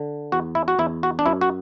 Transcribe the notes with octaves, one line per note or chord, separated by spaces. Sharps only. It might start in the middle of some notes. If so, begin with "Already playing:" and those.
Already playing: D3
E2 F#4
E4
F#4
E2 E4
F#4
D4
F#2 E4
F#4